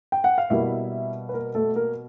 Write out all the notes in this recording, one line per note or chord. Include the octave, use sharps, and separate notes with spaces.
G5
F#5
F5
B2 G3 A#3 E4 E5
B4
A#3 A#4
A3 A4
A#3 A#4